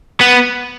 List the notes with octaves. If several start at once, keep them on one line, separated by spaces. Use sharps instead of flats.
B3